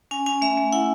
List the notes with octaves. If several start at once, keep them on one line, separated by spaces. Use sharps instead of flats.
C#4 G#5
C#4 G#5
A3 E5
A3
E4 F#5